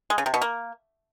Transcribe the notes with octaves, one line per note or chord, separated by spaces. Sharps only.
G#3
C#3
C3
B2
A#3